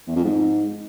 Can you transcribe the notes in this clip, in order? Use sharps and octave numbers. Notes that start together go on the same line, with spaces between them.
E2
F2
G#2